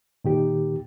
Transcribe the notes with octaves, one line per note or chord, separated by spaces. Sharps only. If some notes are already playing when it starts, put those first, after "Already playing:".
A#2 D#3 G4